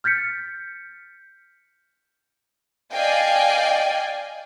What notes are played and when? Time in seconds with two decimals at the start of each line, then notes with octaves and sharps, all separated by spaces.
0.04 F6 G6 A6 B6 C#7
2.92 D5 D#5 F5 G5 G#5